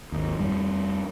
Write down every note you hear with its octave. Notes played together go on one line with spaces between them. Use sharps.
G#1 D#2
F2 G3